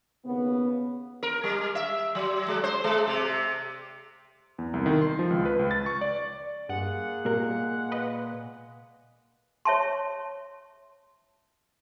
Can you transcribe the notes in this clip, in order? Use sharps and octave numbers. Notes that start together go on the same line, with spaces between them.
D#2 C#3 B3
A#4
G3
E5
F#3
G#3
C5
G#3
C3
E2
C2
D#3
C6
F3
C#2
B4
C#2
A6
C#6
D5
G2 G#3 A#3 G#4 F#5
A#2 G3 A#4
B4 D#5
C#5 E5 A5 C6